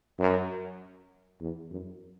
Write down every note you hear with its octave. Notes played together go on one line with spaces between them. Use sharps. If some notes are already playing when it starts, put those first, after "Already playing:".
F#2
E2
F#2